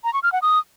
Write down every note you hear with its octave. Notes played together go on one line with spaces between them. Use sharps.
A#5
C#6
F6
F#5
D#6